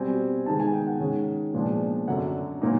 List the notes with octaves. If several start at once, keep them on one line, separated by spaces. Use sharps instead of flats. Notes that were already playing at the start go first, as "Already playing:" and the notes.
Already playing: B2 G3 C4 G#5
D#3 G#3 B3 D#4 A5
G#5
G5
F#5
D#3 G#3 C#4
A#2 F3 G#3 B3 D4
F#2 D3 F#3 F#5
A#2 F#3 A#3 D#4